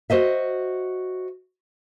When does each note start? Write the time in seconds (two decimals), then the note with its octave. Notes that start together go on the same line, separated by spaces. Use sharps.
0.10 F#4 C5 D#5 E5